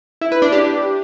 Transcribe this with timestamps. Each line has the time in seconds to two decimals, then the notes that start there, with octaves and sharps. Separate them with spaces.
0.21 E4
0.32 B4
0.42 D4
0.52 G4